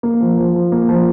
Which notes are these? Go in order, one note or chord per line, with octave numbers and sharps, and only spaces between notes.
A#3
F3
F3
F3
A#3
F3